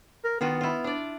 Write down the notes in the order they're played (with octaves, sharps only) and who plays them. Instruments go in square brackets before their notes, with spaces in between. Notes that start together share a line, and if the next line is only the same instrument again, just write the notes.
[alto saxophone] A#4
[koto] D#3 F4 F#4 [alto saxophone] B3
[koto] E4 F4
D4 D5